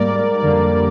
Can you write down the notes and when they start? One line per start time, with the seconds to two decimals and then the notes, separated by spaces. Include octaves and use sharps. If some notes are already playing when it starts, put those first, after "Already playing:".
Already playing: G#2 G3 A#3 A#4 D5
0.43 F2 D3 G3 A#3